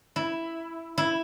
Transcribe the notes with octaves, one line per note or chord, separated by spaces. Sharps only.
E4
E4